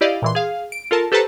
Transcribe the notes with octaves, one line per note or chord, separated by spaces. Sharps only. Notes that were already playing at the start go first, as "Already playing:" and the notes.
E4 G4 D5 D#5 F5
A#2 E3 C6
G#4 F5
D7
F4 A4 A#4 A5
G4 A4 B4 C5 A5 A#5